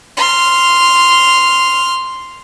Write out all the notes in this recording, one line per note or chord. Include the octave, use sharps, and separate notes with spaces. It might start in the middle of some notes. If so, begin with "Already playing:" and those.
C6 F6